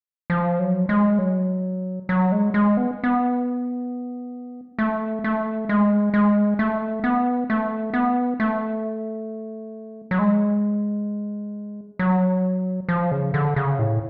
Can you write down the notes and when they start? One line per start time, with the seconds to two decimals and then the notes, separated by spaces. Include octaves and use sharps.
0.30 F3
0.59 F#3
0.89 G#3
1.19 F#3
2.09 F#3
2.32 G#3
2.54 G#3
2.77 B3
3.04 B3
4.79 A3
5.24 A3
5.69 G#3
6.14 G#3
6.59 A3
7.04 B3
7.50 A3
7.94 B3
8.40 A3
10.11 F#3
10.19 G#3
11.99 F#3
12.89 F3
13.12 C#3
13.34 D3
13.56 C#3
13.79 A2